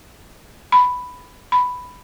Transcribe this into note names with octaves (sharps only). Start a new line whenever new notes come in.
B5
B5